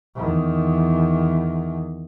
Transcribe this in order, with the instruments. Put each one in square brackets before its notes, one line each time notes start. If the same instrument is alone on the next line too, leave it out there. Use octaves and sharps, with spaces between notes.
[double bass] E2 D#3